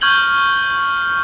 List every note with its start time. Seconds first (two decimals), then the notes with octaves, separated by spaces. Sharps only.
0.01 C#6 F6 G6 G#6 F#7 G7